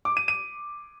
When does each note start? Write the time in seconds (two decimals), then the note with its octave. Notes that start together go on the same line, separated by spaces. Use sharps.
0.05 D6
0.17 D#7
0.28 D#7